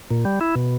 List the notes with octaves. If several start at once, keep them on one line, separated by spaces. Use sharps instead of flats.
A#2
G3
E4
B2